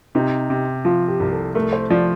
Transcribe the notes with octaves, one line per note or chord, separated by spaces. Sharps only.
C3 D#4
C3
F3 F4
G4
C2
A4
A3 A#4
C5
F3 D5